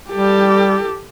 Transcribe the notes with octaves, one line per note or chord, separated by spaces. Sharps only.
G3 G4 A4